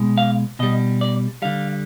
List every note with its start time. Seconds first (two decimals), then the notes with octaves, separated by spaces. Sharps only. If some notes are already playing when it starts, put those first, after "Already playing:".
Already playing: B2 G#3
0.18 F5
0.59 B2 G3 D#5
1.01 D5
1.42 D3 G3 F5